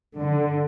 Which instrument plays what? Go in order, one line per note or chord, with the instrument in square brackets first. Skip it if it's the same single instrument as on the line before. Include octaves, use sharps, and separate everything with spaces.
[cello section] D3